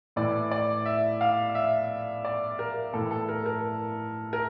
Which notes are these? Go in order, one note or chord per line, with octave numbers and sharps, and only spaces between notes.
A2 E3 D5
D5
E5
F5
E5
D5
A#4
A2 E3 A4
A4
A#4
A#4
A#4